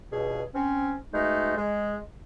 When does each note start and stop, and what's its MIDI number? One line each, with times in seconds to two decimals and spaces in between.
0.12 0.43 37
0.12 0.43 43
0.12 0.43 47
0.12 0.43 68
0.55 0.94 60
0.55 0.94 61
1.13 1.55 47
1.13 1.55 56
1.13 1.55 57
1.13 1.55 63
1.56 1.97 56